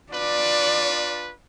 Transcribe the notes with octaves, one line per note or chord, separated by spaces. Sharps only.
D4 F4 B4 D5